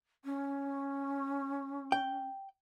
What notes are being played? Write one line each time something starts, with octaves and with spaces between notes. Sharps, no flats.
C#4
G5